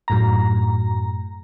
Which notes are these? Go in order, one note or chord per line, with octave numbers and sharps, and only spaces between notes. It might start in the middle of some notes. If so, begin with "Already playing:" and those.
F#2 A2 A#5